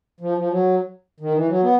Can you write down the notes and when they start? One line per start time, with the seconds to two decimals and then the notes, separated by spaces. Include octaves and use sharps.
0.21 F3
0.38 F3
0.50 F#3
1.20 D#3
1.34 E3
1.48 F#3
1.63 B3